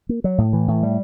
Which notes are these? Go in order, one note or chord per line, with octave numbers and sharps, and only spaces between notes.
A#3
F#3
A2
E3
A2
G3